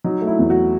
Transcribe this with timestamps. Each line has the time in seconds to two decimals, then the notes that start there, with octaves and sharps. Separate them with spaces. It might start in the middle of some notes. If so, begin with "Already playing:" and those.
0.04 F#3 D#4
0.22 A3
0.27 E4
0.39 E2
0.50 F#4